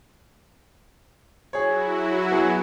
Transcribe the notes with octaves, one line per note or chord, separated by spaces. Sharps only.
F#3 E4 F#4 G#4 C#5
B3 G#4